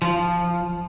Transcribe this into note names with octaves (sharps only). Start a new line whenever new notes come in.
F3